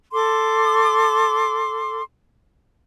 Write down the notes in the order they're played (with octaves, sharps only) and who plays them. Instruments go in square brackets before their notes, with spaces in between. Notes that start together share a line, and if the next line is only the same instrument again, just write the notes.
[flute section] A4 C6 D6